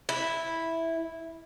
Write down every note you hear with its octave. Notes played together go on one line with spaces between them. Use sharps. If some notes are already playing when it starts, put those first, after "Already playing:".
E4